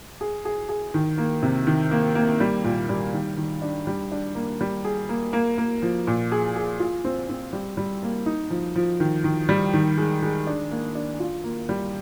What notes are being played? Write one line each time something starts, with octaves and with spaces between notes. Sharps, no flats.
G#4
G#4
G#4
D#3
A#3
C3
D#3
A#3
A#3
G3
A#2
G3
D#3
D#3
D4
G3
D4
A#3
G3
G#4
A#3
A#3
A#3
F3
A#2
G#4
G#4
F4
C4
C4
G3
G3
A#3
D#4
F3
F3
D#3
D#3
G3
D#3
G#3
G#3
D4
A#3
D4
F4
A#3
G3